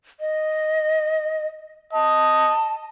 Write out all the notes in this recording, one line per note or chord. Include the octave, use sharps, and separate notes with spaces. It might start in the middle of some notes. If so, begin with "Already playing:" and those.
D#5
D#5 A5